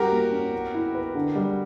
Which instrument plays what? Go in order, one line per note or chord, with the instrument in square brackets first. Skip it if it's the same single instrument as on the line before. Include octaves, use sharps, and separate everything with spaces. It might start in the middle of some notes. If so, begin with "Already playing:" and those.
Already playing: [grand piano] G3 C#4 [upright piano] F#4 G4 A#4
[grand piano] A#3
C#4
B3
E4
B4
D3
G3